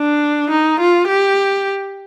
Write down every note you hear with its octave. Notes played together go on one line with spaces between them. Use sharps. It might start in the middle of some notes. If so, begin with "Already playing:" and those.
Already playing: D4
D#4
F4
G4